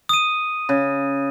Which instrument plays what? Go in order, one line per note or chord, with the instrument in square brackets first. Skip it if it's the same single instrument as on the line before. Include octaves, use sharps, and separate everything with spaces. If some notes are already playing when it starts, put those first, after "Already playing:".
[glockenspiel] D#6 D#7
[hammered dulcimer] C#3